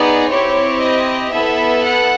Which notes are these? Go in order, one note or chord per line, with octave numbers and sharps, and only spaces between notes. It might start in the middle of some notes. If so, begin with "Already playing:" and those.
Already playing: B3 D#4 G#4 D5
C4 E4 G4 C#5
D#5
B3 E4 A4 E5
F#5